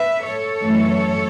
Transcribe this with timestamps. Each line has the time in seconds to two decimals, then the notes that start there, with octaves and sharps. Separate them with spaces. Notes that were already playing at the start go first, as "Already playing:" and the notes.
Already playing: B4 E5
0.24 A4 C#5
0.61 F#2 E3 A3